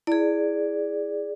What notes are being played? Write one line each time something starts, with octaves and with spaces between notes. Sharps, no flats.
E4 G#4 D5